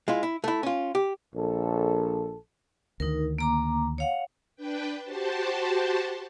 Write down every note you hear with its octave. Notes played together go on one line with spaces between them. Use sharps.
G#3 E4 F4
E4
A3 E4
C#4 F4
G4
A#1 A4
D2 D#3 D#4 A#4
A#3 A#5 D6
C#5 F5 F#5
D4 B4 G5
F#4 G4 C5 A5